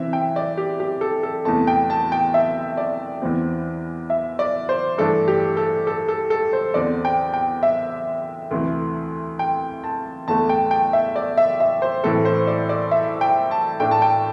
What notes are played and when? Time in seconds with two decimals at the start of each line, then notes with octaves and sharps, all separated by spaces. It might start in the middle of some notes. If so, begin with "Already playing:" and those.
Already playing: C3 E3 C4 E5
0.13 G5
0.36 D5
0.58 G4
0.80 G4
1.01 A4
1.23 A4
1.45 E2 C3 E3 A3 A5
1.67 G5
1.90 A5
2.12 G5
2.34 E5
2.77 D5
3.22 E2 E3 C4
4.10 E5
4.39 D5
4.69 C5
4.98 G2 E3 A3 D4 A4
5.28 G4
5.57 A4
5.87 A4
6.08 A4
6.30 A4
6.53 C5
6.74 E2 D3 C4 D5
7.05 G5
7.34 G5
7.63 E5
8.51 D2 C3 E3 A3
9.39 G5
9.84 A5
10.28 E2 D3 A3 A5
10.49 G5
10.71 G5
10.93 E5
11.16 D5
11.37 E5
11.60 E5
11.82 C5
12.04 A2 E3 C4 A4
12.25 C5
12.47 D5
12.69 D5
12.91 E5
13.21 G5
13.51 A5
13.80 A2 A3 D4 G5
13.91 A5
14.02 G5